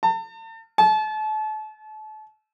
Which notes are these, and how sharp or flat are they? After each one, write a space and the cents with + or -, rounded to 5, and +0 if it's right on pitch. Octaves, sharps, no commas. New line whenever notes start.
A5 +40
A5 -35